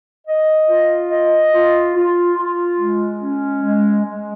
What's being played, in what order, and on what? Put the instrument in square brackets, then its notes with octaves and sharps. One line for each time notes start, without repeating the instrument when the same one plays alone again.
[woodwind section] D#5
F4
D#5
F4
F4
F4
G#3
C#4
G#3
G#3